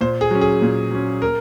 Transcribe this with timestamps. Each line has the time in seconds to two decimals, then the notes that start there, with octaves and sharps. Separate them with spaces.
0.01 A#2 C5
0.21 G#4
0.31 F#3 C#4
0.41 G#4
0.62 A#2
0.91 F#3 C#4
1.22 A#4